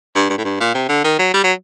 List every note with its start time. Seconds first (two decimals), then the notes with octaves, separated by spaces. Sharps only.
0.15 G2
0.30 G2
0.38 A2
0.44 G2
0.60 A#2
0.74 C3
0.89 D3
1.04 D#3
1.19 F#3
1.34 G3
1.44 F#3